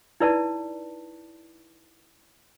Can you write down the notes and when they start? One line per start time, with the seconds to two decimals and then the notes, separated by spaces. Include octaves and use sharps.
0.20 D#4 E4 B4 D5 A5